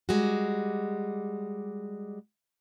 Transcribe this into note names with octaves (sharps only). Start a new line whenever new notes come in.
G3 G#3 F#4